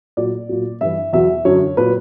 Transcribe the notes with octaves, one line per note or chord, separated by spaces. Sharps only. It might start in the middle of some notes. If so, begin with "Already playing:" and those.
A#2 F#3 D5
A#2 F#3
G2 E3 E5
E2 B2 F#3 E5
F#2 D3 F#3 C#5
A#2 F#3 B4